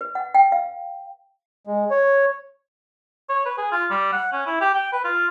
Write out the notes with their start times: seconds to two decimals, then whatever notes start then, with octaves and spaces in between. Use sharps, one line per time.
0.01 B4
0.15 F#5
0.34 G5
0.52 F5
1.67 G#3
1.90 C#5
3.29 C#5
3.46 B4
3.57 G#4
3.72 F4
3.90 G3
4.12 F#5
4.32 C#4
4.46 E4
4.61 G4
4.75 G5
4.93 B4
5.04 F4